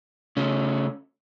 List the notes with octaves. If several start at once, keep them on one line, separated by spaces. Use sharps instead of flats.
C#3 A3 C#4